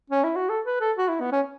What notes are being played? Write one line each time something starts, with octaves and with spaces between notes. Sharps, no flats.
C#4
E4
F#4
A4
B4
A4
F#4
E4
B3
C#4